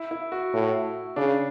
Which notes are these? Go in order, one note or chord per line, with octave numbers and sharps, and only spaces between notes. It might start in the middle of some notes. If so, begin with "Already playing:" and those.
Already playing: E4
E4
F#4
A2
C#3 D4